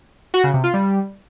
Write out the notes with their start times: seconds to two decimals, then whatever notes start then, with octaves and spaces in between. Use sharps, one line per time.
0.34 F#4
0.44 C#3
0.54 C3
0.64 F4
0.74 G3